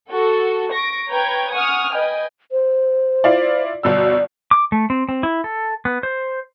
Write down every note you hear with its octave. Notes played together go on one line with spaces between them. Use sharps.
F#4 A4
C#6 A#6 D7
B4 C#5 G5 A#5 G#6
F#5 G#5 C#6 D#6 F6
B4 D#5 G5 G#5
C5
E4 F4 D5
G1 B2 D5 E6
D6
A3
C4
C4
E4
A4
B3
C5